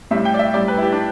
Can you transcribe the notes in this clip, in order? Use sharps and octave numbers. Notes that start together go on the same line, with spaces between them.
A2 G3 E5
G5
D5
E5
A2 G3 D5
B4
E4
G4
D4